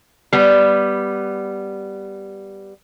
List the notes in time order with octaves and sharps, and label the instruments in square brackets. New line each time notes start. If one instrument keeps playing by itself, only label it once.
[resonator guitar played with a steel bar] G3 B3